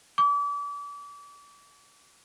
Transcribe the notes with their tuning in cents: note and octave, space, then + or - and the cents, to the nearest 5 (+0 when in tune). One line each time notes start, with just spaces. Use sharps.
D6 -35